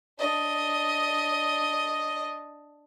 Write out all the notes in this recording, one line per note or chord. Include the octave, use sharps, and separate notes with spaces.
D4 D#5